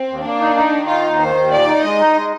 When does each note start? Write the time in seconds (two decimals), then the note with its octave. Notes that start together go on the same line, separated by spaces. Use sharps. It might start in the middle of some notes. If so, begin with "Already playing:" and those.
Already playing: C4
0.09 D#2
0.24 A#3 D4
0.40 D#4
0.56 D#4
0.72 D#3
0.87 D#4 F4
1.04 D#2
1.19 D#3 C5
1.36 D#2
1.51 A#2 D5
1.67 D#4
1.83 G#3 D#5
1.99 D#4
2.14 G#3